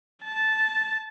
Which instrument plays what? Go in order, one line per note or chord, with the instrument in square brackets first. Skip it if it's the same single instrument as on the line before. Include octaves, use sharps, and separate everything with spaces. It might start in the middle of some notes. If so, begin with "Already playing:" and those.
[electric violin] A5